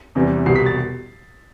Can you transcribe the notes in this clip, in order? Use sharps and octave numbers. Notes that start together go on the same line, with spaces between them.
E2 C3 E3 G3
C2 B2 G3 C7
B6
A6